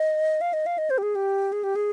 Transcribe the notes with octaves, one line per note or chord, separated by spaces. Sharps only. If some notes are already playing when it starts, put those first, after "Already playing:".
Already playing: D#5
F5
D#5
F5
D#5
C5
G4
G#4
G4
G#4
G4
G#4